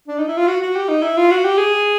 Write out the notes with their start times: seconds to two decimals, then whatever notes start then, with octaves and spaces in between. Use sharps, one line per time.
0.08 D4
0.18 D#4
0.28 E4
0.37 F4
0.47 F#4
0.62 F#4
0.76 G4
0.89 D#4
1.03 E4
1.17 F4
1.31 F#4
1.45 G4
1.57 G#4